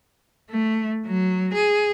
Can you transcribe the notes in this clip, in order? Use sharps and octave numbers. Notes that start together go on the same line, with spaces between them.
A3
F#3
G#4